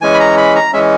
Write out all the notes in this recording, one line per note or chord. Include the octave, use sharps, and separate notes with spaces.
E3 G#3 C#4 G#5
B5
A#5
B5
A#5
E3 G#3 C#4 E5